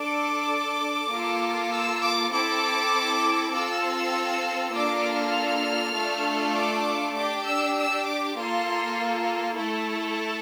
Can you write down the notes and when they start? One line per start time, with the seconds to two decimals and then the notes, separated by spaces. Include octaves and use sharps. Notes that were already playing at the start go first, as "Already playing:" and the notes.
Already playing: D4 A4 D6
1.11 A#3 F4 A4
1.71 E6
2.02 D6
2.31 C4 E4 A4 D6
3.52 C4 F4 A4 E6
4.73 A#3 D4 F4 A4 D6
5.04 F6
5.93 A3 D4 F4 A4
6.54 D6
7.14 D4 G4 D6
7.45 E6
7.75 E6
8.05 D6
8.36 A#3 F4 A4 C6
9.56 A3 E4 A4